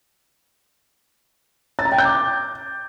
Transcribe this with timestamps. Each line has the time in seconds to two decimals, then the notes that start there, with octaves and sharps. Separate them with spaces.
1.79 A6
1.85 A#5
1.92 G5
1.98 G6
2.05 D6